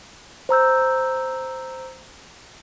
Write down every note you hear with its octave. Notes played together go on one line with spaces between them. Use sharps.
C5 A#5 E6 G6